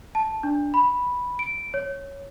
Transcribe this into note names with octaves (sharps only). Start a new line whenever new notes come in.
A5
D4
B5
D7
C#5